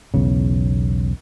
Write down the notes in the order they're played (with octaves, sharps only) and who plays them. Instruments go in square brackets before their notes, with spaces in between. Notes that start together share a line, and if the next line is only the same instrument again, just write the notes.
[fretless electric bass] B1 E2 C#3